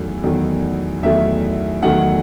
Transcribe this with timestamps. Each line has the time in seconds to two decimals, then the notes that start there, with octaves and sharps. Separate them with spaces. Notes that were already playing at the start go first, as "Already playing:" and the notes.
Already playing: E2 D#3 F#3 A3
0.23 E2 D#3 F#3 A3
1.02 E2 D#3 F#3 A3 E5
1.82 E2 D#3 F#3 A3 F#5